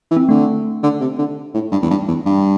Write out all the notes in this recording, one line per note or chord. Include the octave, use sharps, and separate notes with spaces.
E3
C4
D3 A3
D3
C3
D3
A2
G2
E2
G2
E2
G2